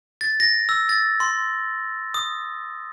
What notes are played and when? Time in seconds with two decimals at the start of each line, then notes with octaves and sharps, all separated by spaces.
0.21 A6
0.40 A#6
0.69 E6
0.89 A6
1.20 C6
2.14 D#6